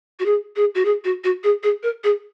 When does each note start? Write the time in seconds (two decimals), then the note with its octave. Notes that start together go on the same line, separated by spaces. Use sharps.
0.20 F#4
0.26 G#4
0.56 G#4
0.75 F#4
0.85 G#4
1.05 F#4
1.24 F#4
1.44 G#4
1.63 G#4
1.83 A#4
2.04 G#4